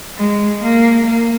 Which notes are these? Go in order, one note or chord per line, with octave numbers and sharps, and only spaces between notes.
G#3
A#3
A#3